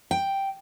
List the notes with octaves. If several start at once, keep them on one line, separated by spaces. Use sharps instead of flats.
G5